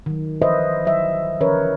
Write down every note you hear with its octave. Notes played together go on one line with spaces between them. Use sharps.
D#3 F#3
E3 F3 B4 C5 D#5 E5
F#3 E5
D3 E3 C#4 A#4 B4 C#5